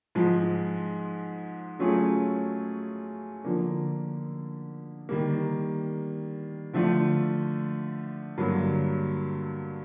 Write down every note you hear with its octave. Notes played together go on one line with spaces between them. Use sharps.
G#2 F3 G#3
F#3 A3 C#4 F4 G#4
D3 F3 A#3 D4
D#3 G3 A#3
D3 F3 A3 D4 F4
G2 D3 F#3 A#3